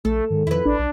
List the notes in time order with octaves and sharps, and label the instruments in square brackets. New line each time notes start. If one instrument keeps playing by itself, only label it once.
[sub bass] A#1 [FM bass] A3 [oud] A4
[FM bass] G#2 [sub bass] D#3
[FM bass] F2 [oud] E4 B4
[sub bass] A1 [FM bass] D4
[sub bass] B1